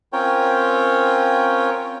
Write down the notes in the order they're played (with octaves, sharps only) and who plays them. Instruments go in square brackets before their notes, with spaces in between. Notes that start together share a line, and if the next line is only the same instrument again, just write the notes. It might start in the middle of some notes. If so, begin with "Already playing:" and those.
[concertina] C4 C#4 F4 A#4 C#5 G5